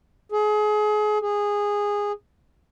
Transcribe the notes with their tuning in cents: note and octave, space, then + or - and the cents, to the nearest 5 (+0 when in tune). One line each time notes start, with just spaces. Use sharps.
G#4 +30
G#4 -15